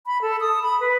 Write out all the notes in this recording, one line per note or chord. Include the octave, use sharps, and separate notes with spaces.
B5
A4
D#6
B5
B4